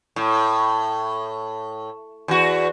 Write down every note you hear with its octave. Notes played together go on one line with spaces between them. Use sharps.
A2
E2 F#4